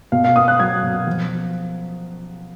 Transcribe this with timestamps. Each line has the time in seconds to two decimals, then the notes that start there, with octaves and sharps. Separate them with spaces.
0.12 B2 F5
0.24 F5
0.36 B3 D#6
0.48 F#6
0.60 F#3 G#6
0.84 B2
1.07 F3